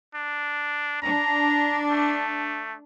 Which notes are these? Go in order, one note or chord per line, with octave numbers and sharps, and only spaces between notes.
D4
D4 A#5
A3